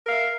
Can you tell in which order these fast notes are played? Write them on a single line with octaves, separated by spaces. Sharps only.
A#4 F5 E5